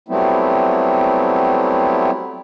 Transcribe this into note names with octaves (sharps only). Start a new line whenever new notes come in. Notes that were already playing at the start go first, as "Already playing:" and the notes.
F#3 G3 A3 B3 C4 E4